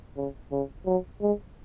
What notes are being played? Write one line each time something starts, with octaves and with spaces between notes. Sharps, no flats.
C#3
C#3
F#3
G#3